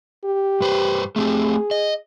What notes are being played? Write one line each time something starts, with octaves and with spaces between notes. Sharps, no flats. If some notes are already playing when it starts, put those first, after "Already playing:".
G4
G2 B4 C5
A3 C4 G4 G#4
D#5